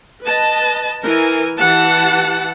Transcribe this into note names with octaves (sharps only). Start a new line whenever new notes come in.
B4 D#5 A5
E3 A#4 G#5
E3 G4 F#5 A5